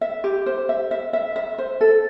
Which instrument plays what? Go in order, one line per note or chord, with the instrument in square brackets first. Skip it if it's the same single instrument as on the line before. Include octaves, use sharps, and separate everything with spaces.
[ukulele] E5
G4
C5
E5
E5
E5
E5
C5
A4